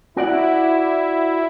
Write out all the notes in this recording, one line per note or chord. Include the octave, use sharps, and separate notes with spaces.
E4 F#4 D5 F#5